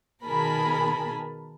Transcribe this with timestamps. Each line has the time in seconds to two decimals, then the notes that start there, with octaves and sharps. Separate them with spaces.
0.24 B2 D#3 G#4 A#4 A5 B5